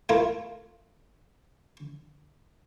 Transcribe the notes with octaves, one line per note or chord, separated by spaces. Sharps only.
A3 E4 F4 A#4